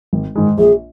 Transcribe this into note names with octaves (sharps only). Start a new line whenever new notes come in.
G#1
G#2 D#3 G#3
A#1 G#4